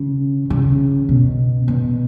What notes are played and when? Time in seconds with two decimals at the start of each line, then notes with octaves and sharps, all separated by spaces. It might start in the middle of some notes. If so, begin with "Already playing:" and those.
Already playing: C#3
0.50 C#3
1.09 B2
1.68 B2